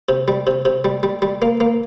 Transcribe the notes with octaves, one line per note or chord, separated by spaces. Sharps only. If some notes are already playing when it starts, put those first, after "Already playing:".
C3
G3
C3
C3
G3
G3
G3
A#3
A#3